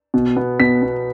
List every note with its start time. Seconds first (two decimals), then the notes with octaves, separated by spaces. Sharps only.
0.14 B2
0.37 B3
0.60 B2 B6
0.82 B3